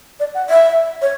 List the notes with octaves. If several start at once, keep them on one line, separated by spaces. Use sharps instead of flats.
D5
F#5
E5
C#5